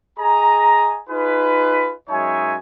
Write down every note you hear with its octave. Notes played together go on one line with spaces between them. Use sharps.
G#4 D#5 G#5 A#5
D#4 F4 G#4 B4
F#2 G#3 D#4 C#5 E5 G#5